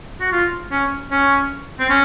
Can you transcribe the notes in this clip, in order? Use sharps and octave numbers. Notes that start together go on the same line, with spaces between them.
F#4
F4
C#4
C#4
C4
C#4